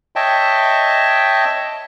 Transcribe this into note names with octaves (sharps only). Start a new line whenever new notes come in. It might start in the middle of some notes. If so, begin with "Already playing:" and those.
C#5 D#5 E5 G5 A5